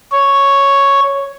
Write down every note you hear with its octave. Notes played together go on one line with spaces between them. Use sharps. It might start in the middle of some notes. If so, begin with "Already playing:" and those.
C#5